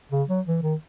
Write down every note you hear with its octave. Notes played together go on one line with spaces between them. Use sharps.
C#3
F#3
E3
D#3